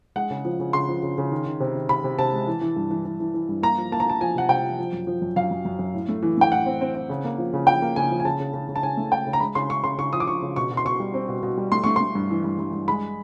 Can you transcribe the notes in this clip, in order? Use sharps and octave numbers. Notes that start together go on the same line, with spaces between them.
G#3 F#5
C#3
F3
C#3
C#3 C6
F3
C#3
C#3
D#3
D#3
C3
D#3
C3 B5
C3
C3 A5
G#3
E3
E3
G2
E3
E3
E3
E3
G2
A#3 A#5
F3
A#3 A5
A#5
A#3 A5
F3 G#5
C3 F#5
C3 G5
F3
F3
F#2
F3
F#2
F#2 F5
F#2
F#2
F#2
A2
A3
E3
A3 G5
A2 F#5
C4
C4
C4
C#3
A#3
F3
C#3
F3 G5
A#3
C#3 G#5
F3
G#5
C#3 A5
C#3
C#3
C#3
A5
C#3 G#5
A3
C#3 G5
C#3
A#5
G#3 B5
C#3 C6
C#3 C#6
C#3 C6
C#3 C#6
F3 D#6
D6
F3 C#6
C#3
B2 C#6
B2
C6
B2 C#6
G3
C4
B2
B2
G3
A3 C6
A3 C#6
A3 C6
G2
E3
G2
G2
G2
G#3 B5